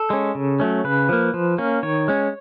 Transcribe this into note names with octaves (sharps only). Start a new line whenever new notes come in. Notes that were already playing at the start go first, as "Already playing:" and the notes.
Already playing: A4
G#3 C#4
C#3
F#3 A3 C#4
C#3 B4
F3 A#3
F3
A#3 C#4
D#3 C#5
G#3 C#4